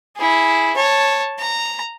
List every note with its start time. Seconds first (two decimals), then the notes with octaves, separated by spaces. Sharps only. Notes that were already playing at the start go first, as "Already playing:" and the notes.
0.17 E4 G#4
0.77 C#5 A5
1.39 A#5